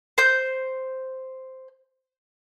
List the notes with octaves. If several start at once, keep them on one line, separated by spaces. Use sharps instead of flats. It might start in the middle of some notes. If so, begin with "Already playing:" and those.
C5 G6